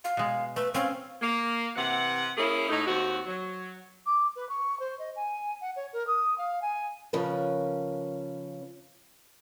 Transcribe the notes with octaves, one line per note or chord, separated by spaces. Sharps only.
F5
B2 G#3
A3 B4
C4 C#4 F5
A#3
C3 E3 F#5
A#3 C#4 E4 G#4 A#4
A2 A3 D#4
D#2 C4 F#4
F#3
D6
B4
C#6
C5
D#5
G#5
F#5
C#5
A#4
D#6
F5
G#5
C#3 F3 C#4 A#4 B4